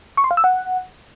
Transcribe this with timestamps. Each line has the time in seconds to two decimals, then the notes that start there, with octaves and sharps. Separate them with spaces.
0.17 C#6
0.24 C6
0.31 F5
0.37 E6
0.44 F#5